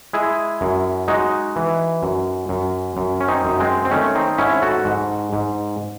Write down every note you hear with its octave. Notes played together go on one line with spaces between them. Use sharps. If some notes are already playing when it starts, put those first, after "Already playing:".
G#3 E4 G#4
F#2
G#3 D#4 F#4
E3
F#2
F#2
F#2
C#4
C4 D#4
F#2
G#3 C4
C4
D#3 A3 C#4
C4 D#4
G#2 C#4 E4
F#4 A4
G#2
G#2